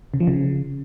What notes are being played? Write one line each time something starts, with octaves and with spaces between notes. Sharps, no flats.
C#3
F3
C#3